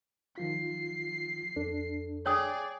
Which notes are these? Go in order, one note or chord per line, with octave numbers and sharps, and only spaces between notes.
D#3 F3 F4 C7
F2 D4 A4
G#4 C#5 D5 G5 D#6